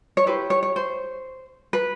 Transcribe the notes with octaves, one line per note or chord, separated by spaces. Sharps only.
C#5
E4 G4 B4 C5
C#5
C#5
C5
B4